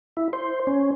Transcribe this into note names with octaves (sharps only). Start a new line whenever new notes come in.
E4
C5
C#4